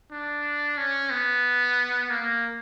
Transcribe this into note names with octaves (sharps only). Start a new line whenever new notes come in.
D4
C#4
B3
A#3